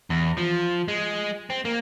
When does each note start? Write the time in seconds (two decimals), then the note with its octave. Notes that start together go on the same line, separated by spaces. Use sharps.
0.10 E2
0.38 F3
0.88 G#3
1.50 C4
1.65 A#3